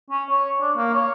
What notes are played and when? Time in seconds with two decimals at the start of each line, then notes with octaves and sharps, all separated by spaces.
0.10 C#4
0.30 C#5
0.61 D4
0.77 A#3
0.94 C#5